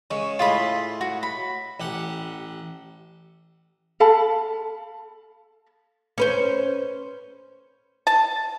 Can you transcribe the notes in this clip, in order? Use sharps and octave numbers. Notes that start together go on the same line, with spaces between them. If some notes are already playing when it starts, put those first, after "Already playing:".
C#3 G#3 C#6
A2 F4 G#4 D#5 B5
F#4
B5
A1 G4 F#5
A4 F5 A5 B5
C#4 B4 C5
A5